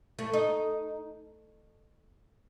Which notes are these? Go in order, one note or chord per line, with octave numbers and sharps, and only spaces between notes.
A3
D#4